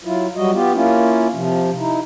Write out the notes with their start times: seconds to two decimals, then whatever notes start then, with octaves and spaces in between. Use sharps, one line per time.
0.05 F#3 E4 F4
0.36 F#3 G3 F#4 D#5
0.53 B3 F4 G4
0.73 A#3 C#4 E4 F4
1.34 C3 F3
1.77 D#4 E4